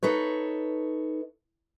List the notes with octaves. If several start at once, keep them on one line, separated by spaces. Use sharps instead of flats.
D#4 A4 B4 C#5